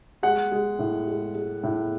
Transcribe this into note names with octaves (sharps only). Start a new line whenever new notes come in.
G#3 F#5
G#3
A2
G#3
G#3
A2